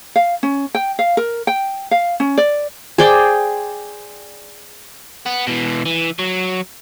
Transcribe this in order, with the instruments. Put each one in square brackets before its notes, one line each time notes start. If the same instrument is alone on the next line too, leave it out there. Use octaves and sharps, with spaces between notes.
[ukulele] F5
C#4
G5
F5
A#4
G5
F5
C#4
D5
[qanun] G#4 C5 D5 G5
[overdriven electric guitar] B3
B2 E3
E3
F#3